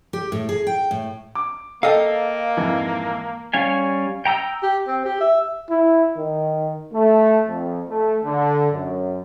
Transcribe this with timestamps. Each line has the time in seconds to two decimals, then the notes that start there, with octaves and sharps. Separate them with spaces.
0.13 G4
0.32 A2
0.49 G#4
0.67 G5
0.91 A2
1.35 D6
1.83 A#3 A4 D#5 F5 G5
2.57 F2 G#2 E3
3.54 G3 C#4 F5 G#5
4.25 G5 A#5 D#6 E6
4.63 G4
4.87 C4
5.05 G4
5.20 E5
5.70 E4
6.17 D#3
6.93 A3
7.47 F2
7.89 A3
8.24 D3
8.72 F#2